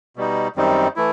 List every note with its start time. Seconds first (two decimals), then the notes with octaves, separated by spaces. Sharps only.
0.16 B2 G3 D#4
0.56 F#2 D#3 G3 C4 D#4
0.96 E3 A3 E4